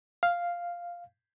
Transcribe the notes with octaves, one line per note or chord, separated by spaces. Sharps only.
F5